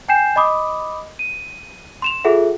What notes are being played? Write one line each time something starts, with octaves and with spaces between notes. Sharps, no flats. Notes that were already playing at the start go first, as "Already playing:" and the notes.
G5 G#5 G6 C7 E7
D#5 B5 D6 D#6
D#7
C6 E7 F7
F4 G#4 A4 E5 F#5